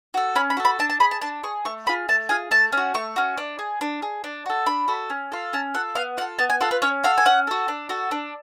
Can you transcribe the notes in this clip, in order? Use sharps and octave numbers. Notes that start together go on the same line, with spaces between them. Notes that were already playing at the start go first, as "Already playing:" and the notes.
F#4 A4
C#4 B5
B5
F#4 A4
B5
D4 A5
A5
G#4 B5
A5
D4 A5
G#4 C#6
A3 C#6
F4 G#4 B5
A3 A5
F4 G#4 G#5
A3 A5
C#4 F#4
A3 C#6
C#4 F#4
D4
G#4
D4
G#4
D4
F#4 A4
D4 B5
F#4 A4
C#4
F4 A4
C#4 A5
F4 A4 F#5
B3 F5
F4 A4 F#5
B3 A5
G#5
F4 A4 F#5
B4
C#4 C#5
F#4 A4 F5
G#5
C#4 F#5
F#4 A4
D4
F#4 A4
D4